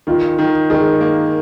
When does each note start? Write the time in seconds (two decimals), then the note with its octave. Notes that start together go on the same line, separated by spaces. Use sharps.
0.07 D#3 F4
0.38 D#3
0.70 D#3 G#4
1.01 A#3